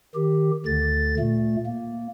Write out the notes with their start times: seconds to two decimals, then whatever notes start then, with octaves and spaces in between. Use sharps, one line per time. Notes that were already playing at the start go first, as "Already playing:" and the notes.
0.15 D#3 G4
0.66 D2 D3 A6
1.19 A#2 A3
1.66 A#3